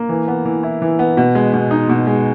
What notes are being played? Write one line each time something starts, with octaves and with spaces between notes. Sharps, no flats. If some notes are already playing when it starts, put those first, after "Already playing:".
Already playing: A#3
E3
B3
E3
E4
E3
B3
B2
G#3
B2
D#4
B2
G#3